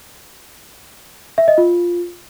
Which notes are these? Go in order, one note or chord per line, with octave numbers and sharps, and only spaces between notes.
E5
D#5
F4